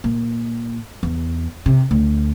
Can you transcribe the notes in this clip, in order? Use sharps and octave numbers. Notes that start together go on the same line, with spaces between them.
A#2
E2
C3
D2